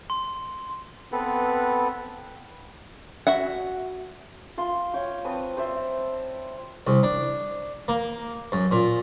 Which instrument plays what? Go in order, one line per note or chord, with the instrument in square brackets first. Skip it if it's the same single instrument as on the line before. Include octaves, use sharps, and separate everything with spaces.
[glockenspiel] C6
[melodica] B3 C4 A4 B4
[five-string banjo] F#4 E5 F#5
[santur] F4 C6
C#5 F5 G5 C#6
C4 B4 A5 D#6
C5 D5 E5
[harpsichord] C2
D4
A#3
F#2
A#2